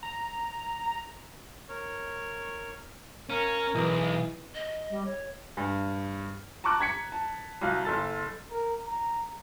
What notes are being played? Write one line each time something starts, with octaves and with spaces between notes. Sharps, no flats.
A#5
A#4 C#5 C#6
C#4 A#4 F5
B1 E3 G#4 D#5
D#5
G3
C#5
G2
A5 A#5 C#6 D6 F#6
A#5 G#6 B6 C#7
A5
C2 F#3 F5
F#1 A4 A6
A#4
A#5